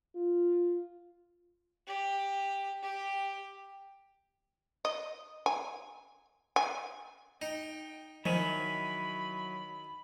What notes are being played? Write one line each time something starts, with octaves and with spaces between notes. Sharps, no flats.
F4
G4
G4
D#5
G#5
G#5
D#4 G5
D#3 F3 F#3 E4 G#5 B5